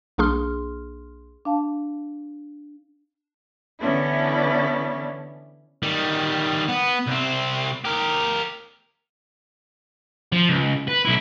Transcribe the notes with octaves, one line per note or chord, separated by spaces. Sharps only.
B1 A#3 D4 G#4 C6 F6
D4 F5 A5
D3 E3 B3 C#4 D4 E4
D#3 G3
B3
C2 C4
G4 A#4
F3
C#2
B4
B1 E4